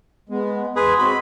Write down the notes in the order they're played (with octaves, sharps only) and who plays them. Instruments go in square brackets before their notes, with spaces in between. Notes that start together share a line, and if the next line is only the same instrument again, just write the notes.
[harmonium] G#3 [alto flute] B3
[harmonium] E2 [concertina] G#4 B4 [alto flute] C6
[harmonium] G#3 C4 F#4 [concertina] B5